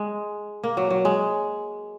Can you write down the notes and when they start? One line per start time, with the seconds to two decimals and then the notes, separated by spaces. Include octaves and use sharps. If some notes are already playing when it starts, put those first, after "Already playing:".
Already playing: G#3
0.64 A#3
0.77 F#3
0.91 F#3
1.05 G#3